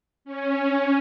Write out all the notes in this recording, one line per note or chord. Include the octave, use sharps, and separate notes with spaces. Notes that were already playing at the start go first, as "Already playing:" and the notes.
C#4